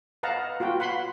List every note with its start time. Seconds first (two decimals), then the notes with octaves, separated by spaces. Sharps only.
0.23 B4 D#5 F5 F#5 A5 A#5
0.60 F4 F#4 B4 G5
0.80 F#5 B5 C6